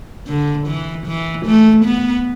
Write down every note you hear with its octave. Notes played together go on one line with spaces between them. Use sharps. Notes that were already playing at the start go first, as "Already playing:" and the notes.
D3
E3
E3
A3
B3